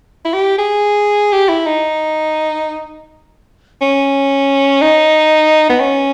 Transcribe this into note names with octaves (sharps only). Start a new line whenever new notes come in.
E4
G4
G#4
G4
E4
D#4
C#4
D#4
B3
C#4